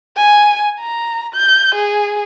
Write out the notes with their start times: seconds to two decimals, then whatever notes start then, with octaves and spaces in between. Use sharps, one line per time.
0.16 G#5
0.80 A#5
1.34 G6
1.75 G#4